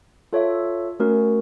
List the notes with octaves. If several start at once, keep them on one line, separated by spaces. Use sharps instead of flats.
F4 A4 C#5 E5
A3 C#4 F#4 A#4